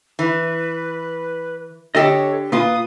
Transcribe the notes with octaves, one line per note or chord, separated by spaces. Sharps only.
E3 B4
D3 G4 A4 C#5 D#5
A#2 F4 B4 D#6